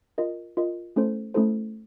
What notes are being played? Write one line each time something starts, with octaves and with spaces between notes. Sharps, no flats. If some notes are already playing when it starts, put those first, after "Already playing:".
F4 A#4 D#5
F4 A#4 D#5
A3 C#4 E4 A4 C5
A3 C#4 E4 A4 C5